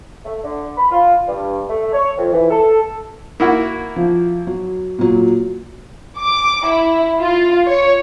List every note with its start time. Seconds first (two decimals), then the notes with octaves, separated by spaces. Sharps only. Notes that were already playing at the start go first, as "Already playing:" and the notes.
0.25 A3
0.44 D3
0.77 B5
0.91 F4
1.27 G2
1.70 A3
1.93 C#5
2.18 F2
2.33 E3
2.50 A4
3.40 A#3 E4 F#4
3.96 F3
4.47 F#3
4.99 A#2 F#3
6.18 D6
6.67 E4
7.21 F4
7.67 C#5